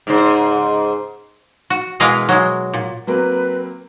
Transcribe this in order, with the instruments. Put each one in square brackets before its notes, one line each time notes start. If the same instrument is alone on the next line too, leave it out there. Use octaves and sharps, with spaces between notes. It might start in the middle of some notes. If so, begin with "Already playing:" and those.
[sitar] G#2 C#3 C5
[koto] F#4
B2 E3 G#3 A#4 B4 F5
F#3 G#3
A#2
[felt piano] F#3 A#3 C4 [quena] B4